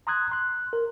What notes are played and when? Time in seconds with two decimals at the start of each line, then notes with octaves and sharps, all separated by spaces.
0.07 A#5 C6 D#6 F#6 G#6
0.31 C6 F#6
0.73 A#4